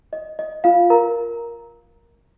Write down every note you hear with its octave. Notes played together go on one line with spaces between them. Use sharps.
D#5
D#5
F4 F5
A#4 A#5